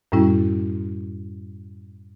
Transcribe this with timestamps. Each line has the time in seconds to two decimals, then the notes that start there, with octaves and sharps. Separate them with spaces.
0.12 F#2 A2 G3 C#4 E4